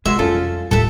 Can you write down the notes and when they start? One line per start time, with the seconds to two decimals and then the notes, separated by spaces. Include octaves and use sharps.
0.05 F2 C3 G#3 F#4 E5 C6
0.19 F2 G3 C#4 F4 G#4 A4
0.71 F1 D#2 A2 G3 A4 E5